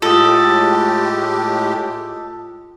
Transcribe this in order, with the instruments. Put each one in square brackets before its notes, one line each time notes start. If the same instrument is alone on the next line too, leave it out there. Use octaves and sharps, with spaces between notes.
[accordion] A2 G#3 G4 [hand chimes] F4 D#6 [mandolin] A4